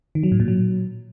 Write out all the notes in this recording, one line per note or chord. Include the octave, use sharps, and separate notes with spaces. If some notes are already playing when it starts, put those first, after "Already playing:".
D#3
F#3
A2
A#2
F#3